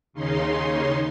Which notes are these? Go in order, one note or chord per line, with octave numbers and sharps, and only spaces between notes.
D#2 C#3 C#4 D#4 C6